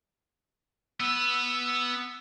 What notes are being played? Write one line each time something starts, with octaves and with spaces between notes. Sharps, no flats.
B3 E6